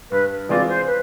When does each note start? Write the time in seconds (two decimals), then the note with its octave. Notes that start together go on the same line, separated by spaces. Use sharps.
0.11 G2 B4
0.49 E3 G#3 C4 F4 D5
0.68 C5
0.87 B4